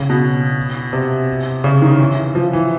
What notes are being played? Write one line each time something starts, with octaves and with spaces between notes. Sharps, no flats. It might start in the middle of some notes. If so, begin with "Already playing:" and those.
Already playing: C#3
B2
C3
C#3
D#3
E3
F3
E3